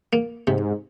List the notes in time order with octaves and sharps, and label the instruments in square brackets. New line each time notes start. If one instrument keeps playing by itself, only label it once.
[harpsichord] A#3
[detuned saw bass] G#2 [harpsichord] C3